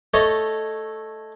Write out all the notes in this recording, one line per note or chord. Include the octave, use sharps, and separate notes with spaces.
A3 A4 C#5 D#5